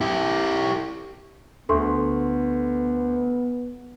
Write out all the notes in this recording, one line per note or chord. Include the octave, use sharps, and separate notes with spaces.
E4 G4
D2 B3 A4 C6 C#6